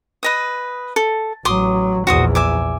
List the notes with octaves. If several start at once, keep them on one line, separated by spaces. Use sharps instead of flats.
B4 D#5 D#6
A4
A1 F#3 C6 D6 D#6
A#1 E2 F#4 C5 D#6
E5 G#5 D6